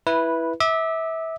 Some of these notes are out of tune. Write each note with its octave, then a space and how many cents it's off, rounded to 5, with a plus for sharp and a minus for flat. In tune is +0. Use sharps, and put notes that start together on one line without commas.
E4 +0 B4 -10
E5 -25 D6 +35